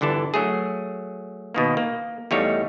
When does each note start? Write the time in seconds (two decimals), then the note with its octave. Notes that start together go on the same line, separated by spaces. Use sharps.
0.01 G1 D3 E3 A5
0.34 F#3 A3 G#4
1.54 B2 D#3 A#3
1.77 A#3
2.31 E2 G3 A3 D#4 C#5 F5